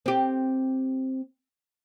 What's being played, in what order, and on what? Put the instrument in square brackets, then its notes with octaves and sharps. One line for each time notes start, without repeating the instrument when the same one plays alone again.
[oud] C4 G4